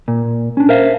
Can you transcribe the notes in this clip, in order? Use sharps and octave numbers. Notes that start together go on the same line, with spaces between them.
A#2
C#4 D4
A#4 C5 E5 F5